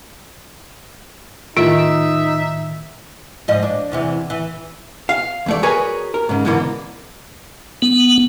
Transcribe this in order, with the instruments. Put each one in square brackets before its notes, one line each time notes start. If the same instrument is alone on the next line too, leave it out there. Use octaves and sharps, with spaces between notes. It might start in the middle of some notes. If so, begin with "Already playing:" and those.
[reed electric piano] A2 D#3 [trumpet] D#4 [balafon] F4 [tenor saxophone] E5
[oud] G#2 F3 D#5
D4
E2 C3 E3
E3
[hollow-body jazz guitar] F5
E2 A3 D5
F#4 G#4 A#4 B4 C#5 G#5
A#4
G#2 C#3
G#2 B2 D3 E3 G#3 A#3
[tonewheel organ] B3